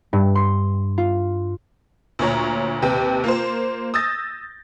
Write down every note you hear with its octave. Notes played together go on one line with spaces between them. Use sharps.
G2
C6
F4
D2 A#2 C#5 A#5
D#2 C3 B4 G5
A#3 F4 C5
D#6 E6 G6 A6 A#6